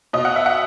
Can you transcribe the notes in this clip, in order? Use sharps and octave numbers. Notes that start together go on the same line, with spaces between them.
B2 D#5
F#5
E5
F#5